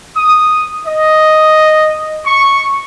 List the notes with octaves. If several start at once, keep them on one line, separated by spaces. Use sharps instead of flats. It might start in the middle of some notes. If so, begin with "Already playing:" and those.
D#6
D#5
C#6